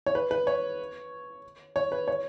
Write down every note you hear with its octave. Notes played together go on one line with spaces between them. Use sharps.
C#5
B4
B4
C#5
C#5
B4
C#5